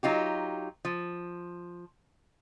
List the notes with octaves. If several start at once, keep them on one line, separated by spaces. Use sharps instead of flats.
F#3 D#4 F4 G4
F3